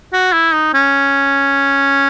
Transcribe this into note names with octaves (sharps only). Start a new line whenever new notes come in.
F#4
E4
D#4
C#4